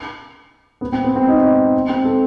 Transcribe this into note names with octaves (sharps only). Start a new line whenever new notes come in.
B3
C4
B3
C4
D#4
C4
A4